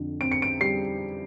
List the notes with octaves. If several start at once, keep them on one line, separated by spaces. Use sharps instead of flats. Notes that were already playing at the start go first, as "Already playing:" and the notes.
Already playing: F2 D3
C4 D7
C#7
D7
G3 C7